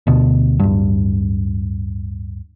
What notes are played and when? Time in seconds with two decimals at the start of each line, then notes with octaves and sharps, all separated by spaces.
0.07 D2 B2
0.60 D1 G2